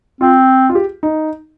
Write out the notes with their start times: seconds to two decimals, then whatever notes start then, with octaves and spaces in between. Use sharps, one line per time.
0.21 C4 F4
0.69 F4
0.75 G4
1.03 D#4